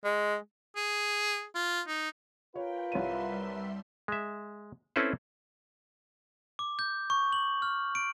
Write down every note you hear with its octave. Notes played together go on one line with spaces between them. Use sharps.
G#3
G#4
F4
D#4
F4 A#4 B4 C#5 G5
C2 G3 C#5 E5 C6 D#7
G#3 E5
C4 C#4 E4 A4 B4 C5
D6
G6
C#6
F#7
F6
D7